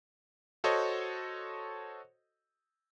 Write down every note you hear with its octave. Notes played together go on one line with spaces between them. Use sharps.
F#4 A4 C5 C#5 D#5